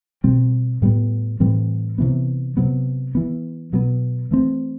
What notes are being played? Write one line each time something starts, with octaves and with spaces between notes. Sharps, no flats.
B2 G3 C4
A2 G3 B3
A2 E3 G3 C4
C3 E3 B3
C3 F#3 B3
E3 B3
B2 F#3 B3
E3 A3 C4